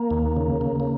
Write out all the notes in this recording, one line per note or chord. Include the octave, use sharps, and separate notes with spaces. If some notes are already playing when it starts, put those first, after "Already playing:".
Already playing: A#3
D#2
C#3
C#3
A#3